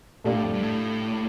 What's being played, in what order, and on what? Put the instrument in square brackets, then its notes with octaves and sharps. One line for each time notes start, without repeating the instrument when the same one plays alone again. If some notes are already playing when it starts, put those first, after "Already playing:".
[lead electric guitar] A#2 [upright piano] A3 D4 G4 D5 F5
[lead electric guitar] A2
F2
G2
A2